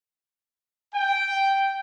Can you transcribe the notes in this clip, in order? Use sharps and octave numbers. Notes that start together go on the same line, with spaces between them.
G5